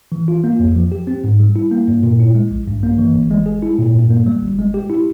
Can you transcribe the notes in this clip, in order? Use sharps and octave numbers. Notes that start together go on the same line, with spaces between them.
E3
F4
A#3
F2
F3
G4
C4
G#2
G3
E4
A#3
G2
A#2
E4
G#3
A#1
G2
A#3
E3
G1
G#3
G#4
E4
A#2
G2
A#3
G3
G1
G#3
G4
E4